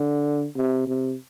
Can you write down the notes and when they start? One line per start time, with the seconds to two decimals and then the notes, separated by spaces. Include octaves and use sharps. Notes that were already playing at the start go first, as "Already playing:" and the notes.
Already playing: D3
0.55 C3
0.86 C3